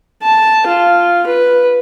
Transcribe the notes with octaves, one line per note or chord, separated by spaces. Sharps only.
A5
F4
B4